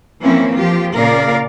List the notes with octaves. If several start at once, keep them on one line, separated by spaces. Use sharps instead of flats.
E3 F3 A#3 C4 C#4 E4
F3 F4 G4
A#2 C#3 A#4 D5 F5